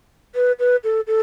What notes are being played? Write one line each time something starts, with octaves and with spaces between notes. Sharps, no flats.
B4
B4
A4
A4